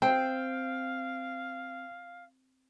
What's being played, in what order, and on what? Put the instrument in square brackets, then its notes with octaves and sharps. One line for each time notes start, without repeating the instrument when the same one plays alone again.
[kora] C4 [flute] F5 [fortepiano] G5